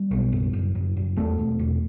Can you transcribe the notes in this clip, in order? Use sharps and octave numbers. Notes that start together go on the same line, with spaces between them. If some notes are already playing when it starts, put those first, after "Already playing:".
Already playing: G3
B1
F#1
F#1
F#1
F#1
E2 A3
E1
E1